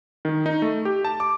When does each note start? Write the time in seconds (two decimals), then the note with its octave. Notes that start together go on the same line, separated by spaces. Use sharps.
0.25 D#3
0.46 D#4
0.62 A3
0.85 G4
1.05 A5
1.20 D6